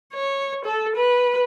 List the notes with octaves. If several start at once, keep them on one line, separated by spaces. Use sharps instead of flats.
C#5
A4
B4